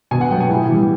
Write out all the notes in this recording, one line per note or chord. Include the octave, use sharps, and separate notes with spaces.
B2 G#5
F#5
F#3 B3 G5
G#5
A2
E3 G3